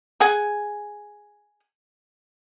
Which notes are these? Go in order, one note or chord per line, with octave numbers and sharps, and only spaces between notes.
G#4 F#5 G#5